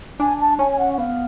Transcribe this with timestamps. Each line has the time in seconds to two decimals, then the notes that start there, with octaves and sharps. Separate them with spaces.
0.20 D4 G#5
0.40 A5
0.59 C#4 G#5
0.72 G#5
0.79 F#5
0.93 F#5
0.98 B3 F5